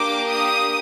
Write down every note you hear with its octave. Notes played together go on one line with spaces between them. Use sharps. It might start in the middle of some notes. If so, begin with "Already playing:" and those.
Already playing: A#3 D4 G4 D6
D#6